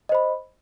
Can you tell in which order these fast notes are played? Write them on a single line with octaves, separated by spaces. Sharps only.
D#5 C5 B5